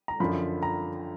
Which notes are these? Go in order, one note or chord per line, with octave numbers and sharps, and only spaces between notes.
A#5
F#2 D3 F3 B5
A#5